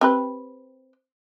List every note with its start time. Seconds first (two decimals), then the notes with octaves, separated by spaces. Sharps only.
0.01 C4 G4 B4